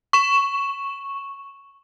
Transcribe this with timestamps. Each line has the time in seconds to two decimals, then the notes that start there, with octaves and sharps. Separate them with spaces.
0.13 C#6 E7